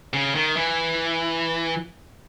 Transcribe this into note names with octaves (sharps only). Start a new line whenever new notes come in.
C#3
D#3
E3